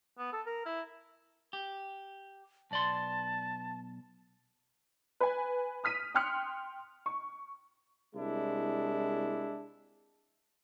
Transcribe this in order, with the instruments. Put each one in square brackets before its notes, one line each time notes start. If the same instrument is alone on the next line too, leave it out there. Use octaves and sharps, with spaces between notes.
[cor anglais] B3
A4
A#4
E4
[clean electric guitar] G4
[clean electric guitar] B1 D5 C6 [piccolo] A5
[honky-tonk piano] B4 G#5
D#6 F6 B6 D#7
G5 C6 D#6 F6 F#6 C#7
C#6
[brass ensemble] C2 G#3 D4 E4